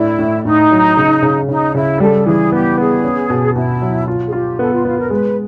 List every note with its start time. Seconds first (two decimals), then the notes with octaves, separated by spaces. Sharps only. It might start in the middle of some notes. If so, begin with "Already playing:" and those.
Already playing: A2 D4 E4
0.19 A2
0.45 A2 D#4
0.71 F#3
0.97 C#3
1.22 C#3
1.48 C#3 D#4
1.74 C#3 E4
2.00 G3 A4
2.26 E3 G#4
2.52 B3 G4
2.77 B3 G#4
3.04 C#4
3.30 B2
3.55 B2 E4
3.82 F#3
4.08 F4
4.27 G#4
4.33 F4 G4
4.59 B3 A4
4.72 F4
4.85 B3 F4
4.98 A#4
5.10 G#3 B4